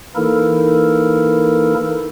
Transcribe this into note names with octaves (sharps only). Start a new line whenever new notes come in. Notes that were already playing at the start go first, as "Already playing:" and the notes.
E3 A#3 D#4 E4 A4 A#4